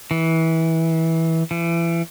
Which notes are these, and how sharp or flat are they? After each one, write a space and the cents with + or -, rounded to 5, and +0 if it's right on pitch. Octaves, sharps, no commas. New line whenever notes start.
E3 -20
E3 +30